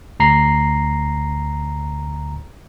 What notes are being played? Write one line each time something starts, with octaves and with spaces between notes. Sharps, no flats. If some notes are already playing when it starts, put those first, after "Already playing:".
D2 A#5 C7